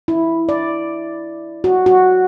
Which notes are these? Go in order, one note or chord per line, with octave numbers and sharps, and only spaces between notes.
E4
D5
F#4
F#4